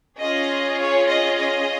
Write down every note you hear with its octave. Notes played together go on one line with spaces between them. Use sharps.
C#4 F4 G#4 D#5
C#5
D#5
D#5